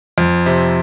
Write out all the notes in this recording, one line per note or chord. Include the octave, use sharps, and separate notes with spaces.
F2
C3